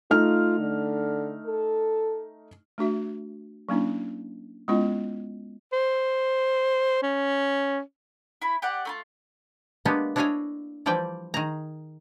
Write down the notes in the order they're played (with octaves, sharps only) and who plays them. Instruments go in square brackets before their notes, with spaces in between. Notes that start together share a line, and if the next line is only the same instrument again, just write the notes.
[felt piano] A3 D#4 F6 [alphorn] F4
[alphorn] D3
A4
[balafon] A3 D4 F#4 E5
F#3 A#3 C#4 D4 E4
G#3 B3 C#4 E4 F4 D#5
[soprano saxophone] C5
C#4
[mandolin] E4 B5
G4 D5 F#5
A3 D#4 F4
[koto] G#3 A#3 B3 D4 G4
D4 E4 C#5 D#5 F5 G#5
E3 F3 G3 D5 G5 G#5
D#3 G#4 A#5